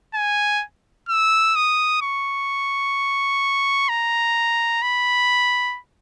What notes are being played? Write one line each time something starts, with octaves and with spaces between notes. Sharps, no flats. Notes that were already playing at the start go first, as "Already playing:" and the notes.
G#5
E6
D#6
C#6
A#5
B5